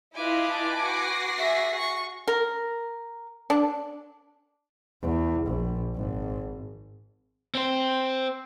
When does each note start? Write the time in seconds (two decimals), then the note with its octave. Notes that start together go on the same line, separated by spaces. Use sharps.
0.15 E4 F4 B4 D#5 G#5 D6
0.51 A5
0.82 F#4 A#6 C7
1.38 G#4 E5
1.79 C#6
2.28 A#4
3.50 D4
5.02 E2
5.46 A#1
5.95 G#1
7.55 C4 C5